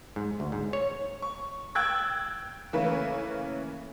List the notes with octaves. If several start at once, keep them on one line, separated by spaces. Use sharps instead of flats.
G#2
D2
G#2
C#5
C#6
G5 E6 F#6 G#6 A6
C#3 E3 A3 A#3 B4